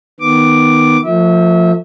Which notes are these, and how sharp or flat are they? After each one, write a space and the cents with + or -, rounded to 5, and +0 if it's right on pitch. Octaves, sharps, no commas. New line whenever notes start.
D#3 +0 B3 +0 D6 +0
F3 +5 A3 +40 E5 -30